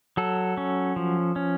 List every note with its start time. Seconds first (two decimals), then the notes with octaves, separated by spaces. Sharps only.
0.17 F#3 A4
0.57 C#4
0.96 F3
1.36 C#4